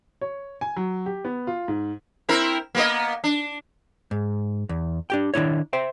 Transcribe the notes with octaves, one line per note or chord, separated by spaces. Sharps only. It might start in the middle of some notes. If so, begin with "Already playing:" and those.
C#5
G#5
F#3
G4
B3
F4
G#2
C4 E4 A#4
A#3 B3 D#5
D4
G#2
E2
D4 G4 G5
D#3 D4 E4 C#5
C5 E5 G5